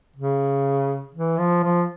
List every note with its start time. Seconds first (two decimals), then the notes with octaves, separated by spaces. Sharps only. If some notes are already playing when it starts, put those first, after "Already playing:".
0.16 C#3
1.15 E3
1.39 F3
1.63 F3